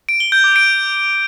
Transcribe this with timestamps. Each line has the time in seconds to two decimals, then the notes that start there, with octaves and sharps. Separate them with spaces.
0.09 D7
0.20 G7
0.32 G6
0.44 D6
0.56 D7